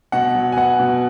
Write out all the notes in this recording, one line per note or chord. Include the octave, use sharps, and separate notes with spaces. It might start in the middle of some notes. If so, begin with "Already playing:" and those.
B2 F#5
F#3
G#5
B3 F#5
B2